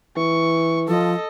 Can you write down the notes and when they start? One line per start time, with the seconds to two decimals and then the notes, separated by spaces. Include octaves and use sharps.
0.17 E3 C#6
0.88 F3 A4 D#5